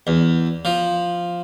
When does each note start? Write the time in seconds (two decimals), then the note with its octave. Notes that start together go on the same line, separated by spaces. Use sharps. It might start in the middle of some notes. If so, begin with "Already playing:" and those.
0.07 E2
0.65 F3